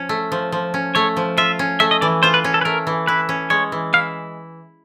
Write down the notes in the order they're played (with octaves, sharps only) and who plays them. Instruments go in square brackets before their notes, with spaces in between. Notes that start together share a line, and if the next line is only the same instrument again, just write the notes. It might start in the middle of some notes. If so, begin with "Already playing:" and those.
Already playing: [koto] F3 C#4
A3
F3
F3
C#4
[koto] A3 [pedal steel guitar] C#5
[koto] F3
[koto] F4 [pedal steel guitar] E5
[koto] C#4
[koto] A3 [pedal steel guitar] E5
[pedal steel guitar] D#5
[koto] E3 [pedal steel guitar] D5
[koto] F4 [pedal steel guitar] C5
[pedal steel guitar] B4
[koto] C#4
[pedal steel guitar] A4
B4
[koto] A3 [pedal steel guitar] A#4
[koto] E3
[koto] E4 [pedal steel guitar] B4
[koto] C#4
[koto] G#3 [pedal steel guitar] C#5
[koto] E3
[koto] E4 [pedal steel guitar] F5